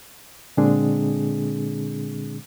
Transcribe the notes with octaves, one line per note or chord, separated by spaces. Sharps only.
A#2 D3 G#3 C4 D4 G#4